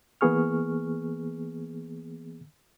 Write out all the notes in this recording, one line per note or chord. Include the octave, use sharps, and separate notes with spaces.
E3 A#3 B3 G#4 C#6 F6